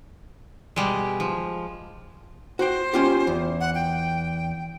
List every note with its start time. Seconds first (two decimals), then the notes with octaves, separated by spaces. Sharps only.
0.76 B2 G3 G#3
1.20 F3
2.59 F#4 C5 G5
2.94 C#4 F4 G4
3.27 E2
3.60 F#5
3.75 G5